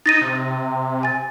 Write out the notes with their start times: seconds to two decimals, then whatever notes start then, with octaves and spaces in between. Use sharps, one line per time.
0.06 D#4 A6 A#6 D#7
0.21 C3
1.03 G#5 A6